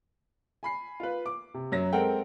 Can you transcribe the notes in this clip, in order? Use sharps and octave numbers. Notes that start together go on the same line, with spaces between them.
G#5 B5 C7
F4 B4
D6
C3
F#2 F#3 A#6
G#3 C4 A4 A#4 F#5 G5